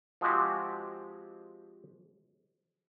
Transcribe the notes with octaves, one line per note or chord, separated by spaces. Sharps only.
F3 G#3 C4 F#4 G4